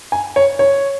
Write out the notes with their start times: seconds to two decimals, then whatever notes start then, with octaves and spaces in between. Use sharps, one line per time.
0.12 G#5
0.36 C#5
0.59 C#5